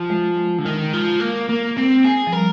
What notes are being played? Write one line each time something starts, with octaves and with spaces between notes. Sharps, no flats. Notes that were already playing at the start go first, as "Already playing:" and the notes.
Already playing: F3
G#3
G#3
D3
D#3 G#3
F3
A#3
A#3
C4
G#4
F3
G3 A#4